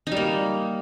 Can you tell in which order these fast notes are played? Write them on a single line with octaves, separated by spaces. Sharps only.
D#4 G3 A#3